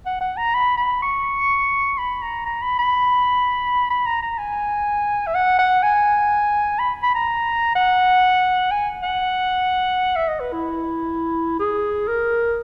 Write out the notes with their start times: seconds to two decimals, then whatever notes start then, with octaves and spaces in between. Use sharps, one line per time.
0.06 F#5
0.21 F#5
0.37 A#5
0.54 B5
0.78 B5
1.02 C#6
1.98 B5
2.22 A#5
2.46 A#5
2.62 B5
2.79 B5
3.90 B5
4.06 A#5
4.22 A#5
4.38 G#5
5.27 E5
5.35 F#5
5.59 F#5
5.83 G#5
6.79 B5
7.03 B5
7.15 A#5
7.75 F#5
8.71 G#5
9.03 F#5
10.16 E5
10.28 D#5
10.40 B4
10.52 E4
11.60 G#4
12.08 A#4